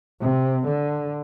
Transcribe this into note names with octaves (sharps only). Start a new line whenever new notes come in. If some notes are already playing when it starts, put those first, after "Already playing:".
C3
D3